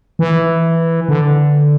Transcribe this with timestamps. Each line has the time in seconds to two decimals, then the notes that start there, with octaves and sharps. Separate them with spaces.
0.19 E3
1.09 D3